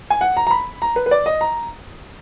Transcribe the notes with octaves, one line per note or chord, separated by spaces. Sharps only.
G#5
F#5
A#5
A#5
B5
A#5
B4
B4
D5
D#5
A#5